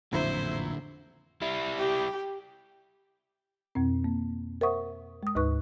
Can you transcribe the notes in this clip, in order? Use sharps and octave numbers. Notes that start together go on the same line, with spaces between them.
A1 F2 A#2 D3 F#3 E4 C5
G3 E4
G4
F2 B2 C4
A#3
A#4 C5 E5 F#5 C#6 D#6
G#3 D#6
D2 G#2 D#4 B4 C#6 F#6